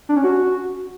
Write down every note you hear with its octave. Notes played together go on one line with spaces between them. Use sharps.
D4
C#4
F#4